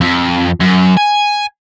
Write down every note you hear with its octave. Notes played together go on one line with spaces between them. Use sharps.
F2
F#2
G#5